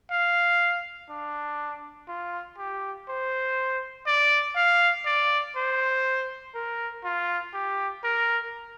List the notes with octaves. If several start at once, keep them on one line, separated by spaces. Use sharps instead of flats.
F5
D4
F4
G4
C5
D5
F5
D5
C5
A#4
F4
G4
A#4